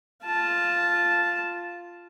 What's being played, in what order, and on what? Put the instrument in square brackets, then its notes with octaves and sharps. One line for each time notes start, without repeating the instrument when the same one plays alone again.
[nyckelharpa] F4 A5